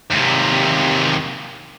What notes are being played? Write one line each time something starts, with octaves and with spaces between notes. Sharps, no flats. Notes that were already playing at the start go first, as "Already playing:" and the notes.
D#2 C3